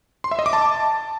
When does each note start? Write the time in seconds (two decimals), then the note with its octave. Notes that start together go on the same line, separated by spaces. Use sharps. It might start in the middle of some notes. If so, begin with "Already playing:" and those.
0.24 C6
0.31 E5
0.39 D#5
0.46 D6
0.53 A5